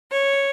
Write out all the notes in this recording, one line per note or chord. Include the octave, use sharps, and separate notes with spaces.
C#5